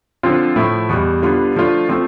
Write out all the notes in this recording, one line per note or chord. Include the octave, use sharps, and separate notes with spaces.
D3 F3 C4 F4
A2 F3 A3 E4
E2 B2 G3
D3 G3 B3 F4
D3 F3 A3 D4 F4
F3 A3 C4 F4